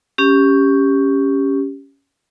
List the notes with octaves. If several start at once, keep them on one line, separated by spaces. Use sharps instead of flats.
C#4 G4